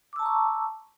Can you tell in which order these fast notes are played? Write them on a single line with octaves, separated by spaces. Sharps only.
D6 E6 A5 A#5 C#6